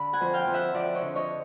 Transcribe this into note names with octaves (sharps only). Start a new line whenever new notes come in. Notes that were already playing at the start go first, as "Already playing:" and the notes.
Already playing: D3 B5
F#5 G#5
F2
F5 G5
F2
E5 F#5
F2 D5 E5
C#5 D#5
D3
C#5 D#5